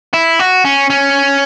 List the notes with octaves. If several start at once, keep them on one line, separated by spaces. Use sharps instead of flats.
E4
F#4
C#4
C#4